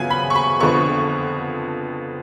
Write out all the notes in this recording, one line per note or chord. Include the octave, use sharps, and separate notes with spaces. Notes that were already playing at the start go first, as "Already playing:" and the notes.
Already playing: C#3 F#3 B3 F4 G#5
B5
C#6
B5
F2 D3 F3 B3 C#6